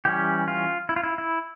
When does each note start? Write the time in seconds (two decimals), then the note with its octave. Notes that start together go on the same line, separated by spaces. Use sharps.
0.05 E3 G3 C#4 G4
0.48 F4
0.89 E4
0.96 F4
1.04 E4
1.18 E4